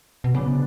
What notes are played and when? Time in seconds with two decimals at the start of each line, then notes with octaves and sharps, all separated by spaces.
0.24 B2
0.35 C#3 F#3 B3 D4